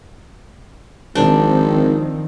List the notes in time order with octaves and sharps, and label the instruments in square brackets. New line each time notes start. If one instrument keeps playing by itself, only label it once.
[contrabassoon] G#1 [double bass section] D#3 F3 C4 [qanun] D4